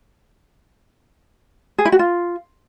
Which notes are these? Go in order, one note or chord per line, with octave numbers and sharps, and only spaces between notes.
G#4
E4
F#4
F4